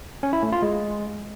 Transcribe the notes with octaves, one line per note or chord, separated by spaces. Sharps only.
C#4
E4
A3
F4
G#3